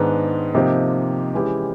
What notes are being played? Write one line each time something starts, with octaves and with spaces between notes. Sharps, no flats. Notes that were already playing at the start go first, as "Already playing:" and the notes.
Already playing: G#2 D#3 G#3 B3 D4
C3 F3 A#3 D#4 G4
E3 G#3 C#4 E4 G4